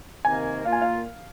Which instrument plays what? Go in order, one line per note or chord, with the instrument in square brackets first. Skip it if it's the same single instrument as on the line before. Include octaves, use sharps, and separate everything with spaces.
[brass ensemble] C3 D#3 A#3 [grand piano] G#5
[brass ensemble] A#2 A#3 F4 [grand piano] F5
[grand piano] G#5
F5